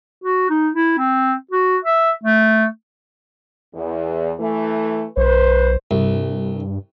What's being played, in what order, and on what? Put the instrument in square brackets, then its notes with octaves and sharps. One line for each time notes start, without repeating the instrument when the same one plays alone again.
[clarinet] F#4
D#4
E4
C4
F#4
E5
A3
[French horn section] E2
E3 A3
[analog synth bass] B1 [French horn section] B4 C5
[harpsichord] C2 [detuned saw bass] G2